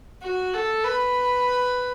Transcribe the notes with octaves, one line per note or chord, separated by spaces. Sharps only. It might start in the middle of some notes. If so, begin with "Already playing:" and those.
F#4
A4
B4